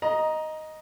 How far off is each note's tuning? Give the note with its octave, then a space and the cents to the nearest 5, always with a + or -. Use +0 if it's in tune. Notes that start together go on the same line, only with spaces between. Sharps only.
D#5 +0 A#5 +15